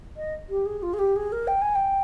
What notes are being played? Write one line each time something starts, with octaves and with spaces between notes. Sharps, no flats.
D#5
G4
G#4
F4
G#4
G4
G#4
A#4
G5
G#5
G5